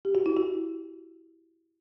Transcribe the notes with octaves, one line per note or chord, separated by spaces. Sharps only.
G4
F#4
E4
F#4